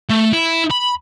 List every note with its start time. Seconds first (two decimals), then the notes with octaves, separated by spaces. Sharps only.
0.09 A3
0.33 E4
0.71 B5